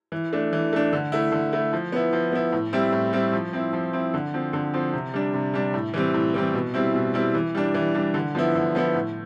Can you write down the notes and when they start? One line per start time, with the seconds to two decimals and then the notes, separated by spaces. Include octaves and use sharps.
0.12 E3
0.33 A3 D4
0.53 E3
0.73 A3 D4
0.93 D3
1.12 A3 E4
1.32 D3
1.53 A3 E4
1.73 F3
1.92 B3 E4
2.13 F3
2.32 B3 E4
2.52 A2
2.73 G3 C4 E4
2.92 A2
3.13 G3 C4 E4
3.33 F3
3.53 C4 E4
3.73 F3
3.93 C4 E4
4.14 D3
4.34 F3 C4
4.53 D3
4.74 F3 C4
4.93 C3
5.14 G3 D4
5.34 C3
5.54 G3 D4
5.74 A2
5.94 E3 G3 C4
6.14 A2
6.34 E3 G3 C4
6.54 B2
6.74 G3 C4 E4
6.94 B2
7.14 G3 C4 E4
7.34 E3
7.55 G3 D4
7.74 E3
7.95 G3 D4
8.14 D3
8.35 F3 B3 E4
8.55 D3
8.75 F3 B3 E4
8.94 A2